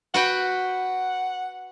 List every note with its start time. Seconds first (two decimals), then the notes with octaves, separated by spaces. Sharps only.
0.14 F#4 B4 F#5 G5